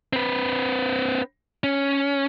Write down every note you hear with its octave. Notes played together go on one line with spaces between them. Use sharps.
C4 B4
C#4